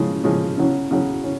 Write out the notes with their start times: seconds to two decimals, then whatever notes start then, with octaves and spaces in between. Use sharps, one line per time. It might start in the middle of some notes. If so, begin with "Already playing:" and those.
Already playing: C#3 F3 G#3 C#4 G#4
0.24 C#3 F3 G#3 C#4 G#4
0.57 C#3 F#3 C#4
0.91 C#3 F#3 C#4
1.24 C#4